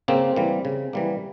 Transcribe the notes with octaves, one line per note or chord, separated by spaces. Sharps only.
C#3 A#3 C4
E3 G3 A#3
C#3
E3 G3 A#3